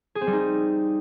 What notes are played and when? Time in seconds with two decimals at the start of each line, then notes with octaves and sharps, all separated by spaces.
0.15 G#4
0.21 C4
0.27 G3
0.33 D#4